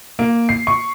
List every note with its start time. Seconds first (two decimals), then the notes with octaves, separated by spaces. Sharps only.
0.19 A#3
0.49 C7
0.67 C#6